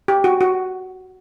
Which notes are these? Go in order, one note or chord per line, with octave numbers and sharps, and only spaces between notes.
G4
F#4
F#4